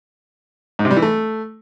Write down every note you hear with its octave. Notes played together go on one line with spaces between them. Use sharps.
G#2
C3
G3
E3
A3